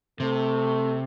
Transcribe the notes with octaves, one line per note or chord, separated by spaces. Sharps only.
C3 A3